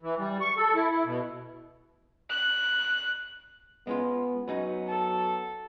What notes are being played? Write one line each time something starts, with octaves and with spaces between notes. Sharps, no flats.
E3
G3
C#6
A4
E4
E4
B2
F#6
G#3 B3 C#4 F4
F#3 B3 C#4 D#4
A4